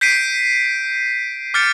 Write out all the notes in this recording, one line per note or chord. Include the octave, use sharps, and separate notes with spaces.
G6 B6 C7 D7 D#7
D6 F6 G6 A6 C#7 D7